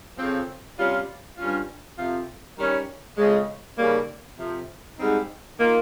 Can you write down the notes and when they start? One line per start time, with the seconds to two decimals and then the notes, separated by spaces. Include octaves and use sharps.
0.18 F2 C#3 F3 C4
0.78 C3 G3 C#4 F4
1.38 G2 G3 C#4 F4
1.98 F2 C3 F3 C4 F4
2.58 D#3 G3 C#4
3.18 F2 C#3 G#3
3.77 D#2 C#3 G3 A#3
4.37 F2 C3 F3
4.97 G#2 G3 C4 D#4
5.58 D#3 A#3 F4